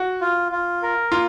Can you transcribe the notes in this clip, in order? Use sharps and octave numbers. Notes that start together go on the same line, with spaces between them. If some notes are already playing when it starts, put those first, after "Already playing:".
Already playing: F#4
F4
F4
A#4
A#3 F4